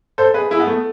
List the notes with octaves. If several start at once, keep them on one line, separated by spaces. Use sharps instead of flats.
A4 C5
G#4 B4
E4 G#4
B3
A3